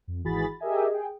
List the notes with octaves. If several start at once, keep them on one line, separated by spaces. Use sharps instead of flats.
F2
G#1 E3 F#4 G#4 B5 A6
G4 G#4 A#4 D#5 E5 G#5
G#4 G5